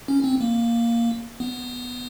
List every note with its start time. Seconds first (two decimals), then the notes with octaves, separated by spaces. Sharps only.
0.08 C#4
0.24 C4
0.41 A#3
1.40 B3